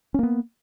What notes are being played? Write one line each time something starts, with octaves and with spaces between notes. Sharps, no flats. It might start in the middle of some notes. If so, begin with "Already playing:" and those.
A#3 B3 C#4